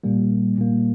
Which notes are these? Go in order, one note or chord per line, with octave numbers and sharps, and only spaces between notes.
A#2 G3 A#3
A#2 G3 A#3